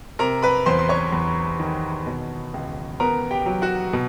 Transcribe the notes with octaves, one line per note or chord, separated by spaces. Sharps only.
C3 A#4 A#5
B4 B5
E2 C5 C6
C6
C#5 C#6
E2
D#3
B2
C#2
B3 A#4 A#5
G4 G5
F#3
F#4 F#5
B2